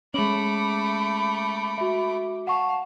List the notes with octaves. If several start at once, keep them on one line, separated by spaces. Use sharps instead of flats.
G#3 A3 C#4 B5 D6 F#7
F#4 E5
F5 F#5 A5 C#6